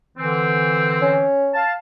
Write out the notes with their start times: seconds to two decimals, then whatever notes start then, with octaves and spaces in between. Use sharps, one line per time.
0.18 D3 E3 C4
1.02 C#4
1.54 F5 A5